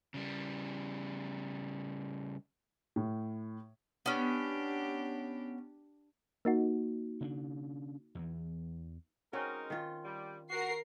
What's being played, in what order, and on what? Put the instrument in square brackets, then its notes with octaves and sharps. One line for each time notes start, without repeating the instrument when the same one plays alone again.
[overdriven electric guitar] C#3 G3
[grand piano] A2
[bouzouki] B3 C#4 [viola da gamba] D4 G4
[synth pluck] A#3 D#4 F#4
[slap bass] C#3 C#4 D4
E2 E3
[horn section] G#3 D#4 A#4 [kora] C4 C#4 F#4
[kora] D#3 F4
[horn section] G3
[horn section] F#4 [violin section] A#4 C7